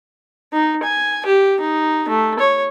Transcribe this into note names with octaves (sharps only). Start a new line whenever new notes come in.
D#4
G#5
G4
D#4
A3
C#5